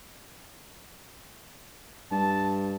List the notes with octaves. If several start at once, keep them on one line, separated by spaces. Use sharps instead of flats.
G2 A5